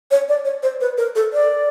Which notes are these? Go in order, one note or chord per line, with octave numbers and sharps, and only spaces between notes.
C#5
D5
C#5
C5
B4
A#4
A4
D5